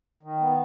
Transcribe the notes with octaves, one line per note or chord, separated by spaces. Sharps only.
D#3
B3